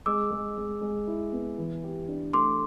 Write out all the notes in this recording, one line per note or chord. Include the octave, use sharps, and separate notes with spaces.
G#3 D6 E6
G#3
G#3
G#3
E4
B3
E3
G4
D4
A3 C6 D6